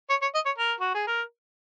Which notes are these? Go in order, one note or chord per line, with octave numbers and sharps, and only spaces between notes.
C#5
C#5
D#5
C#5
A#4
F#4
G#4
A#4